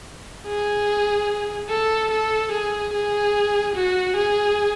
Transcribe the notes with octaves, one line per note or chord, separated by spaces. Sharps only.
G#4
A4
A4
G#4
G#4
F#4
G#4